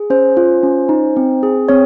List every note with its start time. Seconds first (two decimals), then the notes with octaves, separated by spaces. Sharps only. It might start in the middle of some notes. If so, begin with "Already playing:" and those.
Already playing: G#4
0.10 C#4 C5
0.37 F4
0.63 C#4
0.89 D#4
1.17 C4
1.43 G#4
1.69 C4 C#5